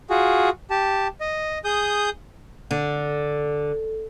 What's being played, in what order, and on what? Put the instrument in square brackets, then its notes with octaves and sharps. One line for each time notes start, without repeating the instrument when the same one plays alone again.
[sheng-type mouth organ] F4 F#4 G#4
G4 A5
D#5
G#4 D#6 G6
[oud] D3